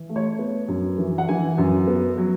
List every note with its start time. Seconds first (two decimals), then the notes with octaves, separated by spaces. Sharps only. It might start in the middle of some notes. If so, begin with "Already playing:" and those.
Already playing: E3
0.09 A3
0.16 C#5
0.39 B3
0.68 F#2
0.98 E3
1.18 F#5
1.29 E3 G#5
1.58 F#2
1.87 B3
2.18 F#3